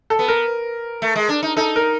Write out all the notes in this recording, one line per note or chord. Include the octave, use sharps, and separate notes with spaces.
A4
B3
A#4
A3
G#3
D4
D#4
D#4 A4
A#4